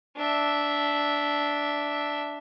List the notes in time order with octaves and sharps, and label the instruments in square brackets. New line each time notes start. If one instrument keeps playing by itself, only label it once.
[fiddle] D4 E5